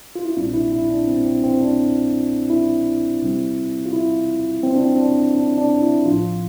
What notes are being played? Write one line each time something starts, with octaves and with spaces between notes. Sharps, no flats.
F4
E4
A#1 A#2 G3 C4 D4
E4
E4
D4
C4
C4
C4
D4
E4
C2 C3 G3 C4
F4
E4
C4
D4
C4
D4
D4
D4
E4
A1 A2 F3 F4